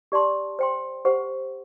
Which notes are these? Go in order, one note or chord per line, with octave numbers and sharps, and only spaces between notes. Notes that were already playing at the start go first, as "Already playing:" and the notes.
G4 D5 A5 C6
C5 G5 C6
G4 C5 F#5